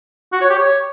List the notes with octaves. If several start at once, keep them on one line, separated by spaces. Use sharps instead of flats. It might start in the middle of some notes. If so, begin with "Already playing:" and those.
F#4
C#5
G4
C#5